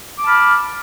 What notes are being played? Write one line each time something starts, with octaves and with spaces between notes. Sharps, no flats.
A5 B5 D6 F6